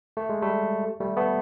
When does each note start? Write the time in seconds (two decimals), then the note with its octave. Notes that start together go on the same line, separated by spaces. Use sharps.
0.17 A3
0.29 G#3
0.42 G3 A3
1.00 G3 A3
1.17 A3 B3